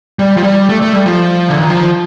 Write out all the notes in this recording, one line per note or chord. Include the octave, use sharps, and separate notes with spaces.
G3
F3
G3
A3
A3
G3
F3
D3
D#3
F3